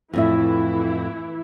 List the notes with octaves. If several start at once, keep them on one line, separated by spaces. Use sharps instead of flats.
F2 A2 E3 E4 E5